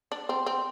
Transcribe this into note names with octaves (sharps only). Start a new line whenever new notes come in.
D4
C4
C4